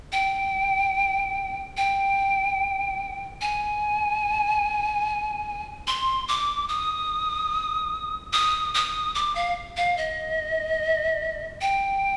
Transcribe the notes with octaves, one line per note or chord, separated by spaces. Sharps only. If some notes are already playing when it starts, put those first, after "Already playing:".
G5
G5
G#5
C6
D6
D#6
D#6
D#6
D6
F5
F5
D#5
G5